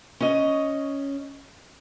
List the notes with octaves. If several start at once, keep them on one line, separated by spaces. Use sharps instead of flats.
C#4 D#5